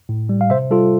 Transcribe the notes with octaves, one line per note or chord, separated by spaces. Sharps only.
A2
G3
F5
C3 C5 E5
G3 F4 A4